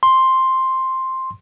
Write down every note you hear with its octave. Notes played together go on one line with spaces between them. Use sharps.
C6